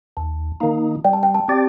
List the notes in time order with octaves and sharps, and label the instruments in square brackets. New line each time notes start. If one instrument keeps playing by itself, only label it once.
[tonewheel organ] D#2 [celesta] A5
[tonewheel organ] D#3 A#3 D#4
[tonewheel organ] G3 [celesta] G5
[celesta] A5
G5
A5
[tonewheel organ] C4 G4 D5